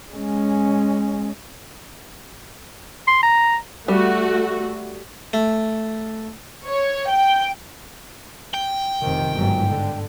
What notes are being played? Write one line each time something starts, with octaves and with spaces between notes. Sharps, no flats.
G#3 C#4
C6
A#5
G3 A3 F#4
A3
C#5
G5
G5
F1 C3 D#3
G1 G#2 F#3
D3